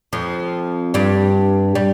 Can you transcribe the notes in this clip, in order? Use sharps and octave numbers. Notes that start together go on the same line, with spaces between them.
F2 F3
G2 G3
G3